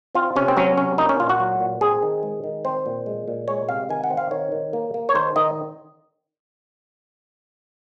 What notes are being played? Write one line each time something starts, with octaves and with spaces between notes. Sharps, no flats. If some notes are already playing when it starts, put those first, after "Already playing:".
C4 F4
C3 C#4
C4
F#3 C#4
C3 C#4
A#3 D#4
C#4
A#2 F4
F#4
F#3
A#2
C4 G#4
D#3
G#3
D#3
C4 C5
A#2
G#3
A#2
G#3 C#5
C3 F5
D#3 G#5
F#5
C4
F5
D#3 C#5
D#3
A#3
A#3
C#5
D#3 C5
D#3 D#5